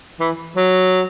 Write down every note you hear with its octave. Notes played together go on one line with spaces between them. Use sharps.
E3
F#3